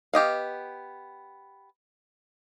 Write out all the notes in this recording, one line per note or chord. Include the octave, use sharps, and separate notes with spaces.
B3 G4 D#5 F5